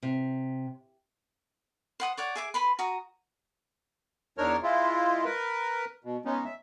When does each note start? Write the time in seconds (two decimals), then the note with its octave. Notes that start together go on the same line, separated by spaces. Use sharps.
0.02 C3
2.00 C5 F#5 D#6
2.17 C#5 D5 F#5
2.36 G#4 E5 D6
2.54 B4 B5 C6
2.79 F#4 A#5 D#6
4.38 E2 D4 D#4 A#4 C#5 F6
4.63 G#3 E4 F4
5.25 A#4 B4
6.04 B2
6.25 G#3 B3 C#4 D#4
6.45 E5